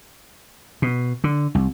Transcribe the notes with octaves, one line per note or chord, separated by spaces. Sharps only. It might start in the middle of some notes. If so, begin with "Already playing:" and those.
B2
D3
C2